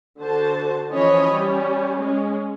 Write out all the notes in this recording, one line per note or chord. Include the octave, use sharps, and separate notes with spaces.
D3 F#4 C5 A5
E3 F3 C#4 C#5 D#5 B5
G3 C#4
G#3 C#4